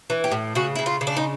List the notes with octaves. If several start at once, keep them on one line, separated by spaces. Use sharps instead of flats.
E3
G4
A2
C#3 F#4
C#3 E4
F4
C#3
D4
D#4